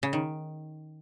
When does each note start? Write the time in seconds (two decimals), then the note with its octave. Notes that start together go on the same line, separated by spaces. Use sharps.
0.03 C#3
0.13 D#3